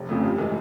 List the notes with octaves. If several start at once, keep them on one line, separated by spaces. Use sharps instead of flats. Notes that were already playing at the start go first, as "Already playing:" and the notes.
Already playing: F1
F2 C#3 F3 A3
G2
E3 G#3